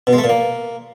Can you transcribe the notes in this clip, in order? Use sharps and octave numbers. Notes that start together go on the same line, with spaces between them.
B2
G#3
A3
A#2
A#3